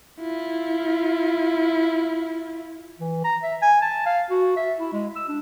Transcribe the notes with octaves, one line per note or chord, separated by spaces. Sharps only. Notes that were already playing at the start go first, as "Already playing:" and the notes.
E4 F4
E3
A#5
E5
G#5
A5
F5
F#4
E5
E4
G#3
E6
D4